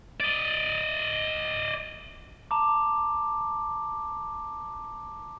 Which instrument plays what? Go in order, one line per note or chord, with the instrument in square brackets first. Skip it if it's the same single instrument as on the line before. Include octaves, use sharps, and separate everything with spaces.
[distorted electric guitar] D5 D#5
[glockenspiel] A5 A#5 D6